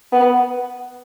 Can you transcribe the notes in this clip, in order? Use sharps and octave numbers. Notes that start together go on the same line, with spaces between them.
B3